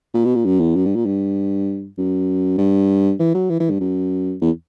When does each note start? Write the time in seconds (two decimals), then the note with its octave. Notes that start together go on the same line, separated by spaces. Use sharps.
0.14 A#2
0.25 B2
0.35 A#2
0.45 F#2
0.60 E2
0.75 F#2
0.86 G2
0.96 A#2
1.06 G2
1.98 F#2
2.58 G2
3.19 E3
3.35 F#3
3.50 E3
3.60 E3
3.70 G2
3.80 F#2
4.41 E2